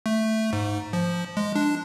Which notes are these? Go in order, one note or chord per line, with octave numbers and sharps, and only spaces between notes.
A3
G#2
F3
G#3
D4